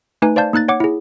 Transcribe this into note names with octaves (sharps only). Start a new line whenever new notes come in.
A3 D#4 B4 G#5
C5 D5 F5 A5 G6
A#3 D#4 F#6 A6
C#5 F#5 D6
E4 G#4